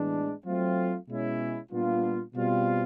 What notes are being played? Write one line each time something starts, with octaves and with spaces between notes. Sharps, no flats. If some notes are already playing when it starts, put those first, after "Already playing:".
Already playing: A2 E3 G#3 B3 D4
F#3 A3 C4 F4
B2 G#3 C#4 E4
A#2 G3 B3 D4 F4
B2 G3 C4 F4